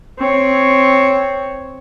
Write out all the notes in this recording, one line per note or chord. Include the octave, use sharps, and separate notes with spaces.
C4 C#5